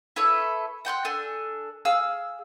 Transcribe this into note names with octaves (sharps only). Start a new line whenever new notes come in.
E4 A4 B4 C#5
F#5 G5 C6 F#6
D4 A4 G#5
G#4 F5 E6